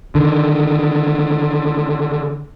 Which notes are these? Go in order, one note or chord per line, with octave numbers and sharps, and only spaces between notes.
D3 D#3